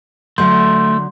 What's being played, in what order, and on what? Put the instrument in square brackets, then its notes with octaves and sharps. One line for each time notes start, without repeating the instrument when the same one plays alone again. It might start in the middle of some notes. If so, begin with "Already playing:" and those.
[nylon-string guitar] D3 F#3 [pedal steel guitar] A3 [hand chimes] C6 G6